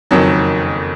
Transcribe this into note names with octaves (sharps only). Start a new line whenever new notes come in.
F#1 F2 D#3 F#3